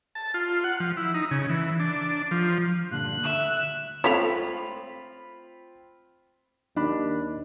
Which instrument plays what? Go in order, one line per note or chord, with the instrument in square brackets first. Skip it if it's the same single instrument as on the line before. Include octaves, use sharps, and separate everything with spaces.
[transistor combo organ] A5
F4
F#5
F3
E4
D#4
C#3
E3
D4
F3
[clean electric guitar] G2 A#2 D3 [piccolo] F#6
[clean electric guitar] D2 [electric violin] E5
[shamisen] A3 C#5 [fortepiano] C4 F4 B5 [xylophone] A4 B6 F7
[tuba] D#2 [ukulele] D4 [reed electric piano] D#4 B5